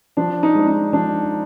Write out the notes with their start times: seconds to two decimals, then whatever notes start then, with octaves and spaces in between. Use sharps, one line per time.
0.17 F3 D4
0.43 D#4
0.55 G#3 D4
0.67 D#4
0.93 F3 D4